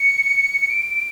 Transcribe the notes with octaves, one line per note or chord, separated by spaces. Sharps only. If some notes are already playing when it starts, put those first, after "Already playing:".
Already playing: C#7
D7